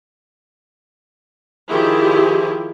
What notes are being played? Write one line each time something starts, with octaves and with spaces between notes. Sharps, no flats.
D#3 F3 E4 G4 G#4